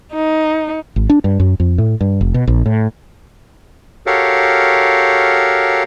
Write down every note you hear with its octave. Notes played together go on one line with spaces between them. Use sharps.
D#4
G#1
D4
G2
F#2
F2
A2
G2
F1
B2
A#1
A2
F#4 G4 A4 A#4 C#5 F5